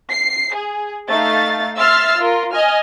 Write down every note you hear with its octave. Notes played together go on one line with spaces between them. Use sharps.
C7
G#4
A3 D#4 F5 A6
E5 C6 E6 F6 A6 C7
F4 A#4
D#5 G#5 F6